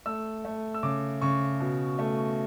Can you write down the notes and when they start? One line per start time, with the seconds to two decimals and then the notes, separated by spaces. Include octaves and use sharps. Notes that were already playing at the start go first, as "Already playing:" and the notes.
0.06 A3 E6
0.45 A3
0.74 E6
0.83 C#3 D6
1.21 C#3 C#6
1.60 B2
1.99 A3